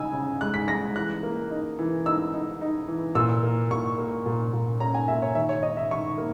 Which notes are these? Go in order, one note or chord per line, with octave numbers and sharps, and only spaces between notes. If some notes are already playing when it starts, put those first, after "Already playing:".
Already playing: C#3 D#4 G#5 E6
C#3
G#3 F#6
B6
G#3 A#6
E3 F#6
A#3
D#4
E3
D#4 E6
D#4
D#4
E3
A#2 E6
A#3
A#2 C#6
A#3
A#2
A#2
C#4 A#5
G#5
A#2 E5
C#5
D#3 E5
C#5
D#4 D#5
E5
D#3 C#6
A#3